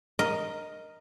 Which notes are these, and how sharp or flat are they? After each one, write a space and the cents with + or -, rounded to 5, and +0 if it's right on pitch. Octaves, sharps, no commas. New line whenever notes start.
A#4 +0 D#5 +0